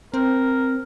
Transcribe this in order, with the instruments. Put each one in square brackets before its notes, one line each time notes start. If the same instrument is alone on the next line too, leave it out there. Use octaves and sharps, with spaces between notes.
[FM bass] C4 [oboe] A#4